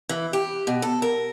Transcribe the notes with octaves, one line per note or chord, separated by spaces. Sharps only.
E3
G4
B2
A4
A#4